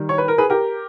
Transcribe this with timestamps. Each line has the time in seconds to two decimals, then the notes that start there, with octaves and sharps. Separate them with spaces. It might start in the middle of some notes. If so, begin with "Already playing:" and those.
Already playing: D#3 G3
0.09 C#5
0.18 B4
0.28 A#4
0.38 G#4 B4
0.50 G4 A#4